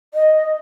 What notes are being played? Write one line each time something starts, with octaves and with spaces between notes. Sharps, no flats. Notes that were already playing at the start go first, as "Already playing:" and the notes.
D#5